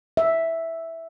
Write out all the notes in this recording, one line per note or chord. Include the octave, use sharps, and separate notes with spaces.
E5